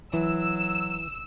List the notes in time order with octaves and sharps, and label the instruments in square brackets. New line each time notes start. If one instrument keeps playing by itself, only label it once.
[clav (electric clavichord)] E3 [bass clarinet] F#3 [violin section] E6